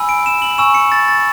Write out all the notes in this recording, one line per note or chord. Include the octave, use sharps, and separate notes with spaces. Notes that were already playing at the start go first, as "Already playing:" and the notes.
Already playing: G#5 B5 E6
D7
E7
F#7
G#5 C#6 E6 E7
C#7
A6
A6